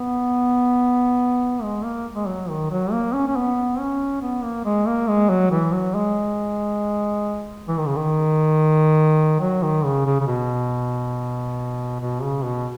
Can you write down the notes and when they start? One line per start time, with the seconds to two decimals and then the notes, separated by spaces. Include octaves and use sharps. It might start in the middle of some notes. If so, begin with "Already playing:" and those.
Already playing: B3
1.63 G#3
1.84 A#3
2.15 G#3
2.27 F#3
2.49 D#3
2.71 F#3
2.92 A#3
3.14 C#4
3.28 C#4
3.36 B3
3.79 C#4
4.22 B3
4.43 A#3
4.65 G#3
4.87 A#3
5.08 G#3
5.30 F#3
5.51 E3
5.73 F#3
5.95 G#3
7.68 E3
7.78 D#3
7.86 C#3
7.96 D#3
9.40 F#3
9.63 D#3
9.84 C#3
10.06 C#3
10.20 C#3
10.27 B2
12.00 B2
12.22 C#3
12.44 B2